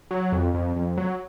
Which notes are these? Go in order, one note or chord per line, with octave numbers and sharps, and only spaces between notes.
F#3
F2
F2
F2
F#3